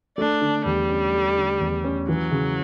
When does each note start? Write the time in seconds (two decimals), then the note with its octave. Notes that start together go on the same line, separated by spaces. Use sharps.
0.18 A3 D4
0.41 D3
0.65 E2 G3
0.89 C#4
1.14 A3
1.37 D3
1.60 E2
1.84 C#4
2.09 E3 F#3
2.32 C#3